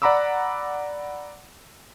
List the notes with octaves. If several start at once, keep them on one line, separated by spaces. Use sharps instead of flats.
D5 F#5 A#5 B5 D6 E6